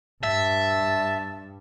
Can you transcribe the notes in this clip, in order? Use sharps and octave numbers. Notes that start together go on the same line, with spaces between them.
G2 E5 A5